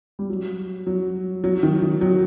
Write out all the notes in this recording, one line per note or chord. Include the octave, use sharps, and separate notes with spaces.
G3
F#3
F#3
F#3
D#3
D#3
F#3